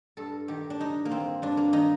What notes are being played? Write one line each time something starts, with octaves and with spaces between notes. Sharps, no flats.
G2 A4
D#3 G4
D4
G2 D#4
A#3
D#3 C4
G2 D4
A#3
D#3 D#4